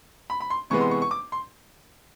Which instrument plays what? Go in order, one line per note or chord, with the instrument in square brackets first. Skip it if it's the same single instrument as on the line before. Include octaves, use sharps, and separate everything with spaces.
[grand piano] B5
B5
C6
C3 E3 G#3 B3 C#6
C6
C#6
C#6
D6
C6